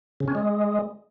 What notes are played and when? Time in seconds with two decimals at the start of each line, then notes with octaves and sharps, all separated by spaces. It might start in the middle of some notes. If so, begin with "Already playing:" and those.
0.20 C#3
0.28 C#4
0.35 G#3